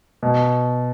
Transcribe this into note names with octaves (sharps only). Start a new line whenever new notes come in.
B2